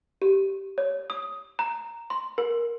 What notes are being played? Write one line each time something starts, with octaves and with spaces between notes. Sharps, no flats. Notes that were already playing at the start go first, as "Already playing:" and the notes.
G4
C#5
D#6
A#5
C6
A#4